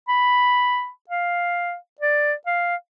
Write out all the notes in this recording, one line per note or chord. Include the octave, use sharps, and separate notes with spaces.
B5
F5
D5
F5